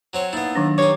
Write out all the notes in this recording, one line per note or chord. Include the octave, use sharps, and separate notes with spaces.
F#3 C4 C#5
A#3 B3 D#4 E4 A6
D#3 F#3 D4
G2 D#4 G4 C#5 C#6 D6